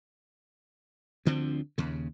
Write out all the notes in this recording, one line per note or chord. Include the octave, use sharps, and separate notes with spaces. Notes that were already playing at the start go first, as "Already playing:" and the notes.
D2 D3 F3 C4
D#2 C#3